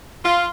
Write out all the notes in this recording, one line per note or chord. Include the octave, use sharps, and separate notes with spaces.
F4